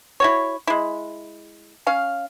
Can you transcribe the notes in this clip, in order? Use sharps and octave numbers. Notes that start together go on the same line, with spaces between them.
E4 F#4 C#5
G#3 E4
C#4 F5